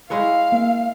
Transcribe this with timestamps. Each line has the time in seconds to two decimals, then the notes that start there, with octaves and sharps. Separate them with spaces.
0.10 G#3 E4 C#5 F5
0.52 A#3 E5